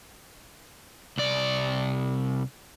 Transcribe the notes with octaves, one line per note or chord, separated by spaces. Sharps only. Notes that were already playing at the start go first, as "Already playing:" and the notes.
C2 D5